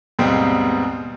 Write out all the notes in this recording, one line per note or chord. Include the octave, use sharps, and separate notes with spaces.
D#2 G#2 B2 G3 G#3 C4